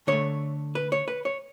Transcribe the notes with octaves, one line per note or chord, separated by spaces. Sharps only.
D3 A3 C#5
B4
C#5
B4
C#5